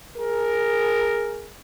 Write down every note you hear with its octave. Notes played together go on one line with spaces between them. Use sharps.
G#4 A#4